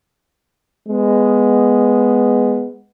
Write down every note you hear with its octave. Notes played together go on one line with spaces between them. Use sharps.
G#3 B3